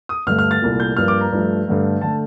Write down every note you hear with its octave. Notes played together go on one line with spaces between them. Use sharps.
D#6
G2 D3 A3 F6
F6
A6
C2 A#2 A3
G6
G2 F3 A#3 F6
D6
A#5
G2 F3 A3
G2 D3 A3
D3 A3 A5